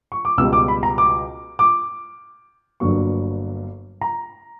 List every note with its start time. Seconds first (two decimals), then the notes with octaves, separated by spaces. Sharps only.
0.12 C#6
0.25 D6
0.38 C#2 B2 G3 E6
0.53 D6
0.68 B5
0.83 A#5
0.98 D6
1.59 D6
2.80 G1 G2 F#3 A#3 C#6
4.01 A#5